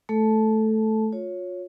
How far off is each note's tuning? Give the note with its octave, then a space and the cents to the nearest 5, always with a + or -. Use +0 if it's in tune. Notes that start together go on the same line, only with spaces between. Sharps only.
A3 -10 A4 -5 A5 -10
F4 +35 C#5 +0